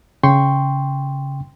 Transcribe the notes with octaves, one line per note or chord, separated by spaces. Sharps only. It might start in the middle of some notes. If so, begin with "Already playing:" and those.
C#3 G5 C6 C#6